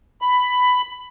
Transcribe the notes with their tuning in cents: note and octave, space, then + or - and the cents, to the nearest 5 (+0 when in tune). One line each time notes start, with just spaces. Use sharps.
B5 +10